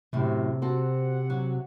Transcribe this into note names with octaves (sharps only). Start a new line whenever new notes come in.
F#2 A2 C3
C4 F#4 A4 F#5
F#3